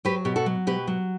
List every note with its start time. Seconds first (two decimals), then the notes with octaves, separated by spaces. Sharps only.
0.05 F#3 G4 B4
0.25 B2 G4
0.36 F#4 A4
0.46 F#3
0.67 B2 G4 B4
0.87 F#3